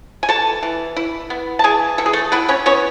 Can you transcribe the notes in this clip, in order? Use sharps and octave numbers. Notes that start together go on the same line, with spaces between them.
G#5
E3 A4 A5
E3
E4
B3
A5
E3 G#4 G#5
E3 A4
G#4
A3 A4
B3 E4 B4
C#4 C#5
B3 C#4 C#5